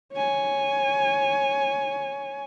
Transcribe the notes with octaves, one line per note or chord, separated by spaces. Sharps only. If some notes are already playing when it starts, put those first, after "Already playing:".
C#5 G#5